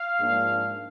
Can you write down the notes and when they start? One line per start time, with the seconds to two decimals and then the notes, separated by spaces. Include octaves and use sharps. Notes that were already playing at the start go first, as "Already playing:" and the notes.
Already playing: F5
0.19 G#2 F3 A#3 D4